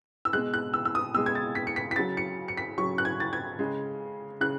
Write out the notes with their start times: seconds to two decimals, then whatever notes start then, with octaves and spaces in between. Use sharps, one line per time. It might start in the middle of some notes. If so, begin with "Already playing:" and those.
0.25 E6
0.33 B2 G#3 F#6
0.54 F#6
0.74 E6
0.85 E6
0.95 D#6
1.14 B2 G#3 E6
1.26 G#6
1.35 A6
1.55 B6
1.67 C#7
1.76 B6
1.91 B6
1.96 C#3 F#3 A6
2.17 C#7
2.48 C#7
2.57 B6
2.78 C#3 F#3 C#6
2.98 F#6
3.05 G#6
3.20 A6
3.33 G#6
3.59 C#3 G#3
4.41 C#3 F#6